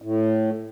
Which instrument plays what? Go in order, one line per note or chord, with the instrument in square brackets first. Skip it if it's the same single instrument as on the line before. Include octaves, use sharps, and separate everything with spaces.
[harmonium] A2